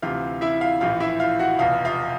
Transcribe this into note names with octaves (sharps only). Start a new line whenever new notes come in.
D2 C3 E3 F4 F5
E4 E5
F4 F5
A#1 A2 E3 F4 F5
E4 E5
F4 F5
F#4 F#5
F1 E2 B2 F4 F5
F4 F5